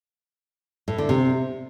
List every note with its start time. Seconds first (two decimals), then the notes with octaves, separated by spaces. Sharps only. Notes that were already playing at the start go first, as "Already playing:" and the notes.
0.88 A2
0.98 D3
1.09 C3